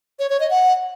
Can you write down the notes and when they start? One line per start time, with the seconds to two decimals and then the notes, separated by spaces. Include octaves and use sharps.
0.19 C#5
0.30 C#5
0.40 D#5
0.50 F#5